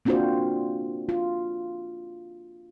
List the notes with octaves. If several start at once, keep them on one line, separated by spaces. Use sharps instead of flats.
A#3 C4 D4 F4 F#4 C5
F4